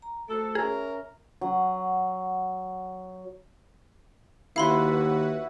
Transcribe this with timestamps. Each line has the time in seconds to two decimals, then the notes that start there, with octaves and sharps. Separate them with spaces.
0.02 A#5
0.28 A3 F#4 A4 C5
0.55 C#4 G#4 A#4 E5 A#5
1.41 F#3 F#5
4.56 D#2 E4 F#4 B4 F5 F#5 B5 C6